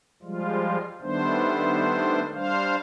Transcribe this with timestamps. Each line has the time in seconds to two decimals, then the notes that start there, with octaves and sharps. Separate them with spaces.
0.23 F3 G3 G#3 F4
1.01 D#3 G3 A3 B3 D4 C5
2.34 G3 D4 C5 F5